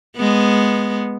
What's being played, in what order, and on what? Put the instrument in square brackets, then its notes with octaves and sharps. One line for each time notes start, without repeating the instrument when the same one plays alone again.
[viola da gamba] G#3 B3